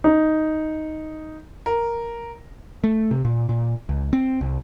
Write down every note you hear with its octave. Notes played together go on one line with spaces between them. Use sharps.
D#4
A#4
A3
C3
A#2
A#2
C#2
C4
C2